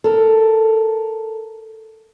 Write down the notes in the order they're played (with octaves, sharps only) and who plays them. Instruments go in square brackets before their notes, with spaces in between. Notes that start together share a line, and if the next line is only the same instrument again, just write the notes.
[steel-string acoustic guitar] A4 A#4